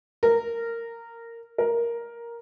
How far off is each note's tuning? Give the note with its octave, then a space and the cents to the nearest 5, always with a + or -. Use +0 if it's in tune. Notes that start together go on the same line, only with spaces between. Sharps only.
A#4 -15
A#4 +5